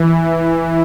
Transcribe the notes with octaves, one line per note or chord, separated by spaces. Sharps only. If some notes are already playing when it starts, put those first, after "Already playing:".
Already playing: E3